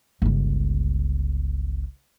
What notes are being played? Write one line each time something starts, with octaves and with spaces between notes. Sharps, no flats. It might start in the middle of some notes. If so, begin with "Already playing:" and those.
G1 C#2